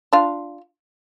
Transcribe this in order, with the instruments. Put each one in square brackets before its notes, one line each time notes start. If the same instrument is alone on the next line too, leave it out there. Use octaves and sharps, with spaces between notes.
[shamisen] D4 F4